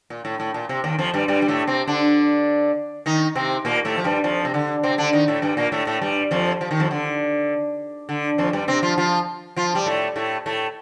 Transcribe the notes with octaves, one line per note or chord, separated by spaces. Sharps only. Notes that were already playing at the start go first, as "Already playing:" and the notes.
A#2
A2
A2
A#2
C3
D#2 D#3
F2 F3
G2 G3
G2 G3
G3
A2 A3
C3 C4
D3 D4
D#3 D#4
C3 C4
A#2 A#3
A2 A3
F3
G2 G3
F2 F3
C3
D3
C3 C4
D3 D4
D#3 D#4
A2 A3
G2 G3
A#2 A#3
A2 A3
A2 A3
G2 G3
F2 F3
F3
D#3
F2 F3
D3
D3
F2 F3
G2 G3
C3 C4
F3 F4
F3 F4
F3 F4
G3
A2 A3
A2 A3
A2 A3